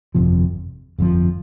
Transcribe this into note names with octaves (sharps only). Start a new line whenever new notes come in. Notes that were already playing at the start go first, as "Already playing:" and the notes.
G1 F2 C3 F3
G1 F2 C3 F3